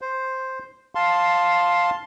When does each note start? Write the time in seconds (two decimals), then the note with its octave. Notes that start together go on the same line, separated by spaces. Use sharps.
0.01 C5
0.95 F5 A5 C6